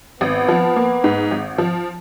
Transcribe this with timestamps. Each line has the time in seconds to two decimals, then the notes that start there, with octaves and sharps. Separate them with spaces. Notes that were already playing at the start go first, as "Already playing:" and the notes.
0.20 G#1 B3
0.48 F3
0.76 A#3
1.04 G#2
1.31 G#1
1.58 F3